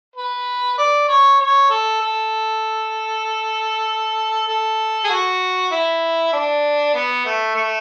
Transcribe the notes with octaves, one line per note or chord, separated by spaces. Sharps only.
B4
D5
C#5
C#5
A4
A4
A4
G#4
F#4
E4
D4
B3
A3
A3